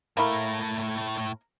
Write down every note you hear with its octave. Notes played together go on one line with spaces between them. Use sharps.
A2 A3 A#3 E4 A#4